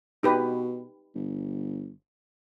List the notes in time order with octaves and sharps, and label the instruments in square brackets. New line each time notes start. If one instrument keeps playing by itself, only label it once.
[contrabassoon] B2 [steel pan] D#4 G4 B4
[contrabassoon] G1